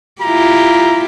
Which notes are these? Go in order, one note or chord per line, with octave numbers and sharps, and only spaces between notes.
E4 F4 G4 A#5